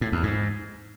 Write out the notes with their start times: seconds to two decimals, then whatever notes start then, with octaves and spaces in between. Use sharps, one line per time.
0.01 A2
0.12 E2
0.23 G#2